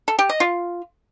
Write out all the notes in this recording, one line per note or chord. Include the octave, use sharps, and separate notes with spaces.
A4
G4
D#5
F4